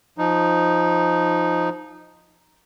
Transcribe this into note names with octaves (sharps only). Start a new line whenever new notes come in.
F3 D#4